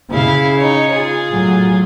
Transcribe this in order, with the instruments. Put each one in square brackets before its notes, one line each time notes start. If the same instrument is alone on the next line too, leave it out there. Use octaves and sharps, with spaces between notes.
[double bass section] C#3 [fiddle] E4 F5
[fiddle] D#4 C#5
F4 G#4
[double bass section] A2 F#3